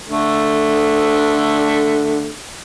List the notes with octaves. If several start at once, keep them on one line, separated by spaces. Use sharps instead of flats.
D3 A3